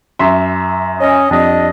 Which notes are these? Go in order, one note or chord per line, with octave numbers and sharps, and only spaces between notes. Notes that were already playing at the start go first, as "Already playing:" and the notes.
F#2 E5 C6
C#4 D#5
F2 G3 D4 D#5